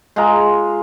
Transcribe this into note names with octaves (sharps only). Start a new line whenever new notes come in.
G#3 F4 A#5